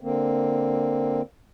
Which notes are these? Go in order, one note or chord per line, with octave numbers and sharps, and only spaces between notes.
D3 A#3 C4